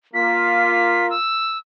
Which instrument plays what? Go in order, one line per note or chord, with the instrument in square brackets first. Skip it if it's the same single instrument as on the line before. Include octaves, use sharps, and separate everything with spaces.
[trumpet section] A#3 F4 [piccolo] B6
[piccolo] E6